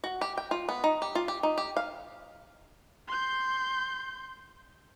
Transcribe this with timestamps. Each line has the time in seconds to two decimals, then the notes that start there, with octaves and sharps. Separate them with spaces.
0.04 F#4
0.21 G4
0.38 G5
0.51 F4
0.69 B3
0.84 D#4
1.02 G4
1.15 F4
1.28 G4
1.43 D#4
1.58 G4
1.77 F5
3.08 C6 G6